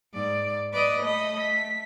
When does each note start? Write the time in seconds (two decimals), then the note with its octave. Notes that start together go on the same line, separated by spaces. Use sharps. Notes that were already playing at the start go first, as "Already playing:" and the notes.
0.14 G#2 D5
0.73 B4 D5 D#5
1.04 A3 D#5 B5
1.39 B6